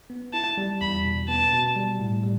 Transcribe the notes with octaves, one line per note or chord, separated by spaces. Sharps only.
B3
E4 A5
G3
E2 B5
B2
B3 A5
B2
G3
A2
G3